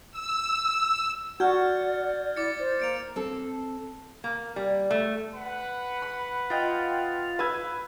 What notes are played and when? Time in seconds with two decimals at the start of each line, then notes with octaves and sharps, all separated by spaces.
0.12 E6
1.40 F#4 D5 F#5 F6 G6 G#6
2.36 E4 D6 A6 C#7
2.59 C5
2.80 A#3 C#7 D7 F7
3.16 C4 A4
4.24 A#3
4.56 G3
4.91 A3
5.35 B4 F#5
6.02 B5
6.50 F4 D#5 G5
7.39 B4 E6 G#6